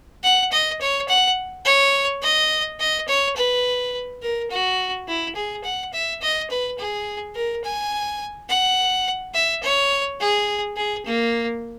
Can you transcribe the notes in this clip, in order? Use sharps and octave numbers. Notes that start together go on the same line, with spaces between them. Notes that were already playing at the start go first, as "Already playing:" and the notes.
F#5
D#5
C#5
F#5
C#5
D#5
D#5
C#5
B4
A#4
F#4
E4
G#4
F#5
E5
D#5
B4
G#4
A#4
G#5
F#5
E5
C#5
G#4
G#4
A#3